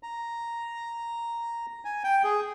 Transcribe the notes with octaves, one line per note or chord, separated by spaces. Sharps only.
A#5
G#5
G5
G#4